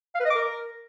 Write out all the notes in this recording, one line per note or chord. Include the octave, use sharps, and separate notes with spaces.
F5
B4
D#5
D6
A#4